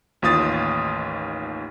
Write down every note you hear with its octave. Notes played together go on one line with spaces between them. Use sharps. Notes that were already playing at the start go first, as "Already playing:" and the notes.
A1 D#2 F4 D#6 A6